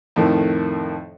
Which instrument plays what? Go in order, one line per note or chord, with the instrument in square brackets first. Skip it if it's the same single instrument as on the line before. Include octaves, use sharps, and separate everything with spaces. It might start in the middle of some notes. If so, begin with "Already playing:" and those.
[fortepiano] F2 A2 D#3